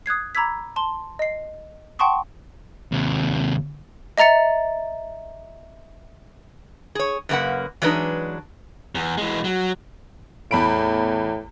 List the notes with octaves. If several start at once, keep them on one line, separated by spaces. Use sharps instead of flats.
D#6 F#6 G#6 C7
A#5 B5 D6 E6 G#6 B6
A5 C6 G7
D#5 C7
F#5 G5 A5 C6 C#6 D#6
D#2 C3
D#5 E5 A#5 A6 C#7
G#4 C#5
F#2 C#3 A#3 B4 F#5
E3 F#3 G#3 D4 D#4 B4
E2
E3 G#3
F#3
E2 A2 B5 D7